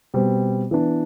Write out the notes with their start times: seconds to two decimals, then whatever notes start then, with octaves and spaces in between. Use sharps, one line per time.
0.14 B2 G3 C4
0.71 E3 B3 D4